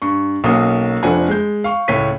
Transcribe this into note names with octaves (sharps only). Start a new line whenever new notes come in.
G2 C#6
B1 A#3 C#4 F#4 D#6
F1 F3 A3 D4 F#5 G#5
G#3 G6
F5 C#6
C#2 A2 C#5 B6 D#7